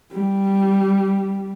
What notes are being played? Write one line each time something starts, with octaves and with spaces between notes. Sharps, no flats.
G3